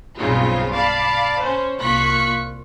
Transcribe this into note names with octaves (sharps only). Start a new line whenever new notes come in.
B1 G2 C#3 C4 D#4 F4
D5 F5 A5 B5
C#4 C5
C2 A#3 F4 C#6 F#6 B6